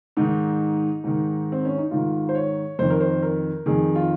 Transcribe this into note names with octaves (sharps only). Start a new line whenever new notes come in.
G#2 D#3 D#4
G#2 D#3
C4
C#4
D#4
G#2 D#3 F4
C5
C#5
F2 D#3 C5
A#4
C5
A#4
F2 D#3 G#4
F4